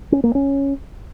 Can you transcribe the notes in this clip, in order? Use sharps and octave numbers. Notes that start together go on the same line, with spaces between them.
C#4
A#3
C#4